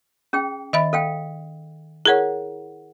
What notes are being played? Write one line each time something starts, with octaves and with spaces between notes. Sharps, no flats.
C#4 G#4 G5
D#3 D#5 E5 B5
A4 F5 G5
E4 G#4 A#4 C#5 F#5